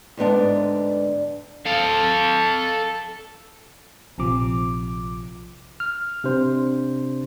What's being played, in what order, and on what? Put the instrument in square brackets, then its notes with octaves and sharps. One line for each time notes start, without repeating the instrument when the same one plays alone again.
[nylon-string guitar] D2 G#2 B3 D4
[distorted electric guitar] A4 F5
[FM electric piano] A#1 C3 F3 D6
[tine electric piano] F6
C3 D4 C5